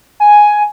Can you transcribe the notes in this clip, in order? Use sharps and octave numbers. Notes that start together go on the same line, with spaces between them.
G#5